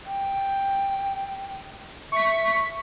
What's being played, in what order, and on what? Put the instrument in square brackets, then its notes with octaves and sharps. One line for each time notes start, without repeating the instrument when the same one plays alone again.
[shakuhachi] G5
[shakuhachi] E5 [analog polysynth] C#6 B6